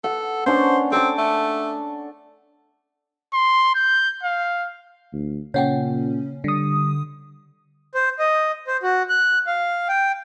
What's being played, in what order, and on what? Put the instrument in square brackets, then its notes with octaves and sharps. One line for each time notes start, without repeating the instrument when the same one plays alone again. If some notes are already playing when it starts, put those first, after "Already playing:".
[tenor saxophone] A4 [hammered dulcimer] F#5
[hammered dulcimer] C#4 D4 F#5 [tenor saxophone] C5
[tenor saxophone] C4 [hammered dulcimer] A4 D6
[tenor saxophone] A3
[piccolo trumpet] C6
G6
F5
[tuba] D2
[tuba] A#2 [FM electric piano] C#3 C#4 [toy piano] C#5 F#5 G5
[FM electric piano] D3 D#6 [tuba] G3
[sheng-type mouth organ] C5
D#5
C5
F#4
F#6
F5
G5